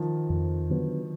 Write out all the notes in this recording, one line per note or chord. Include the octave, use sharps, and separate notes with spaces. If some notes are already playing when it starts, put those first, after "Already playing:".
Already playing: D#3 F3
F2
D3 F#3 B3